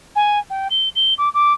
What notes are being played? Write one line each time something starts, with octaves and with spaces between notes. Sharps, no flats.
G#5
G5
G7
G7
D6
D6